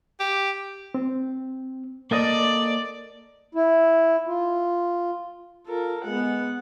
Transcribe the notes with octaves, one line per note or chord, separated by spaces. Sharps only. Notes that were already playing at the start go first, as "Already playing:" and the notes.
G4
C4
A#3 A4 D5 D#5
E4
F4
F4 A4 A#4
G#3 B3 F#5